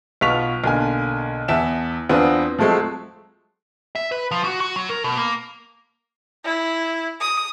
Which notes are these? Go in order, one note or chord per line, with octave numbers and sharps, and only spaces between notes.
B1 B3 F4 C#6 B6 F7
B1 D3 A#3 G#5
E2 E5 A5 E7
E2 B3 C4 D4 F4
F3 F#3 G#3 A3 C4
E5
B4
F3
F#4
F#4
F#3
A#4
B2
A#3
E4
D#6